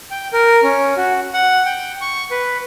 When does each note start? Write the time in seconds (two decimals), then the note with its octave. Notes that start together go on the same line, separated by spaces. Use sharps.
0.11 G5
0.33 A#4
0.63 C#4
0.97 F#4
1.33 F#5
1.66 G5
2.01 C#6
2.31 B4